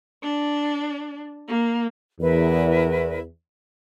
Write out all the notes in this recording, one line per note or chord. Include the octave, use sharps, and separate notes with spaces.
D4
A#3
E2 E4 A#4 B4